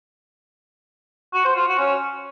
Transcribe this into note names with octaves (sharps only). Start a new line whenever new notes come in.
F#4
C5
F4
F#4
C#4